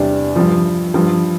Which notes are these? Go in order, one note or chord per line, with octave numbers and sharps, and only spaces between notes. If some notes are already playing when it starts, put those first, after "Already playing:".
Already playing: E2 C3 G3 D4
G2 F3
G2 F3